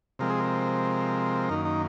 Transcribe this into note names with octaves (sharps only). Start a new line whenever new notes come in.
C3 F3 G#3 C4 A#4
G#4
A#4
F#2 D#3 A#3 D#4
D#4